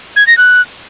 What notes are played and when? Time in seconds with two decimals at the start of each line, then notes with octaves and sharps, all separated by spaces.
0.16 G#6
0.27 A#6
0.38 F#6